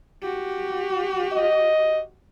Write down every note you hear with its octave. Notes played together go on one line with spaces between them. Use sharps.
F#4 G4
D#5